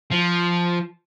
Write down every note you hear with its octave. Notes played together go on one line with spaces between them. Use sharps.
F3